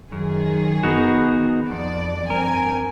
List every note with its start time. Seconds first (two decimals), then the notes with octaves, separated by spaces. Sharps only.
0.12 F#2 D#3 G#4
0.83 B3 D#4 F#4
1.71 F2 D5
2.30 G2 C4 A#4 G#5